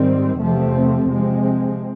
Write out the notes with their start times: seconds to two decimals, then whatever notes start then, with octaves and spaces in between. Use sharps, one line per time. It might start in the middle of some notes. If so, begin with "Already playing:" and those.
Already playing: G#2 D#3 G3 C4
0.38 E2 C3 F3 A3 C4
1.10 C3 F3 G#3 C4